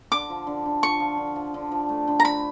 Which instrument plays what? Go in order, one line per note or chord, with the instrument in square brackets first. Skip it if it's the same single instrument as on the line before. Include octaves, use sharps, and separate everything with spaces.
[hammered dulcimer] D3 [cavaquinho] D6
[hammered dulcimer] F3
D3
D3
[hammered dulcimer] F3 [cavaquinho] C#6
[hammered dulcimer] F3
D3
F3
D3
F3
A3
D3
[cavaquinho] A#5
[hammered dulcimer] D3 [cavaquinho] B5